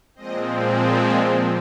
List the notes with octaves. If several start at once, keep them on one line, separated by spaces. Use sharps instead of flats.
A#2 F3 G#3 C4 D#5